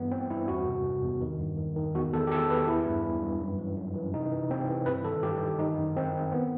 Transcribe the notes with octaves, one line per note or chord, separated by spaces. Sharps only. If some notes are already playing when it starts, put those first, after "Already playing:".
Already playing: G2 E3 B3
E3 C4
G2 E4
E2 F#4
C3
C3
E2
D#3
G2
D#3
D#3
E2 F#4
E2 A4
G4
E2 A4
E2 B4
E3 E4
G2
E3
G2
F#2
E3
F#2
E3
C3 D#4
E3
C3 C4
E3
G2 B4
D#3 A4
G2 G4
D#3
D#3 D#4
F#2
D#3 C4
D#3
B3